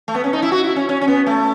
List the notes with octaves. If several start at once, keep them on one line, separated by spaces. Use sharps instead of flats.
A3
B3
C#4
D#4
E4
F#4
E4
C#4
C#4
C#4
B3
A3